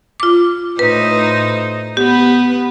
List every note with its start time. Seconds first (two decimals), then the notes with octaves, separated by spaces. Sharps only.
0.20 F4 D6
0.79 A2 D#4 B4 C5
1.97 B3 G4 B4